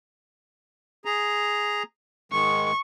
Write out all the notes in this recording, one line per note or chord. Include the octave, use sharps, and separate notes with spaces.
G#4 A#5
G#2 D#3 G#3 C#6